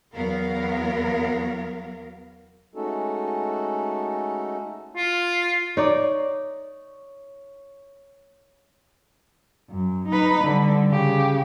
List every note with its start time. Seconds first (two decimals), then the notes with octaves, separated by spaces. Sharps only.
0.14 E2 F#3 B3 A#4 F5
2.75 G#3 A3 C#4 D#4 F#4 A4
4.96 F4
5.77 D#4 C#5 D5
9.70 F#2
10.08 D#4 B4
10.44 D3 G3
10.89 C#3 G4